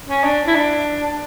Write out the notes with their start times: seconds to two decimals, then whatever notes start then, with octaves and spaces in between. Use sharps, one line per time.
0.08 C#4
0.24 D4
0.47 E4
0.55 D4